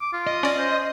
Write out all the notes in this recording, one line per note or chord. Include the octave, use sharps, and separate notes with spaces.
D6
F4
D#5
C#4 D5
C5